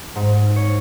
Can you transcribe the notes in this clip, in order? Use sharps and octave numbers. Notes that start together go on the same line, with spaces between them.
G#2
C#5